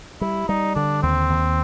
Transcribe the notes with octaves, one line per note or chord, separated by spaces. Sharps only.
G3 E4
G3 D#4
D3 D4
D#2 C4
D#2